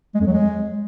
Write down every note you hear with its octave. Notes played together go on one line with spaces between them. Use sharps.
G#3
F2
F#3
G#3